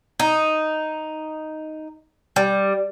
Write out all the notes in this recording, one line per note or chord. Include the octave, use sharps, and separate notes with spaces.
D#4
G3